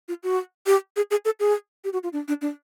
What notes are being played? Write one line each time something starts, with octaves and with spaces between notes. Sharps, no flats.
F4
F#4
G4
G#4
G#4
A4
G#4
G4
F#4
F4
D4
D4
D4